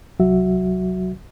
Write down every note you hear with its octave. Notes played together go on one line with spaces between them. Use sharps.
C2 F#3 F#4 E5